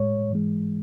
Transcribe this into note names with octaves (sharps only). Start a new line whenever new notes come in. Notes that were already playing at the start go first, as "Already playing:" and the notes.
Already playing: A2 G#3 C#5
G#2 E3 G#3